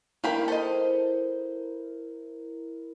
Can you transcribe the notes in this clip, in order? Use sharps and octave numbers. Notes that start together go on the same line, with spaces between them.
G2 A#3 E4 G4 A#4 B5
A4 C5 D#5